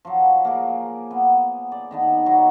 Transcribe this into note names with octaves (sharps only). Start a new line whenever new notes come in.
F3 F#3
A#3 G#4
B3
D5
D#3 B3 D4
F#3 B3 D#4 F#4